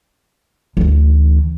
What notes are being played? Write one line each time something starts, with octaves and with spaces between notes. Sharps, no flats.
D2 E3